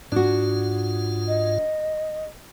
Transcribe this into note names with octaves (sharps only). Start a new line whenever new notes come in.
G#2 D4 F4 F#4
D#5